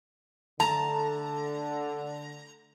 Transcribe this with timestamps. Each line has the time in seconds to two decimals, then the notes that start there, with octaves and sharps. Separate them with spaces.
0.60 D3 A3 A5 A#5